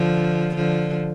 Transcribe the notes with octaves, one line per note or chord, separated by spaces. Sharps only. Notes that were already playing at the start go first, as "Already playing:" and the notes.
Already playing: D3 F3
D3 F3